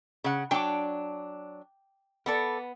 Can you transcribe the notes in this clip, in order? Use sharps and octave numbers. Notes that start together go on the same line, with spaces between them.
C#3 F#5
F#3 D4 G5 D6
B3 A4 D5 E5